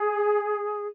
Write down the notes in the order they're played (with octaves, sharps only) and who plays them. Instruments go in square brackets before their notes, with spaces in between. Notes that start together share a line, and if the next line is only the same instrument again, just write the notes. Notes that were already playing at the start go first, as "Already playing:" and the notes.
Already playing: [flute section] G#4